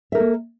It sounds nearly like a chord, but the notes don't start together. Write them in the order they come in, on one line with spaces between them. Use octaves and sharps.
E5 A#4 A4 A#3